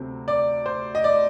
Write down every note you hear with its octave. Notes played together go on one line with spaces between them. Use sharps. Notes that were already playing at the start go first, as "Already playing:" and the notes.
Already playing: D2 C3 F#3 A3 C4
D5
C5
D#5
D5